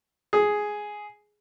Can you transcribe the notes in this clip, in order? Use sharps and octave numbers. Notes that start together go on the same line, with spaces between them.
G#4